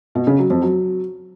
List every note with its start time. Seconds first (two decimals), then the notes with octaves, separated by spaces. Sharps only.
0.15 B2
0.27 C#3
0.39 F#3
0.50 F2
0.62 F#3